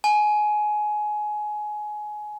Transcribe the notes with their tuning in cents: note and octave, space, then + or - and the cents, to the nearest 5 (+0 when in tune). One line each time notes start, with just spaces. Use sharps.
G#5 +20